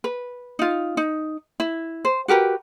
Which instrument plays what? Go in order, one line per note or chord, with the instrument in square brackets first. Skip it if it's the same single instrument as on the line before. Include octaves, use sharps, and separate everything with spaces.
[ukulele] B4
D#4 F4
D#4
E4
C5
F#4 G4 A#4 B4